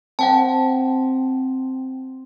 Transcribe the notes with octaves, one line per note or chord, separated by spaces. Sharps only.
C4 F#5 G5 A5